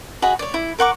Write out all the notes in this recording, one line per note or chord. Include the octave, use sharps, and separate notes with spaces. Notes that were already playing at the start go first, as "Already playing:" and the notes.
F#4 G#4 D#5 B5
C#5 D5
E4
A#4 F#5 C#6 D6